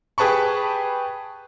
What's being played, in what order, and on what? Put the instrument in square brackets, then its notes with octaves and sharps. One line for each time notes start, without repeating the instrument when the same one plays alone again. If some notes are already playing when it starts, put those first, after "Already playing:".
[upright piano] G4 G#4 B4 A5 B5 C#6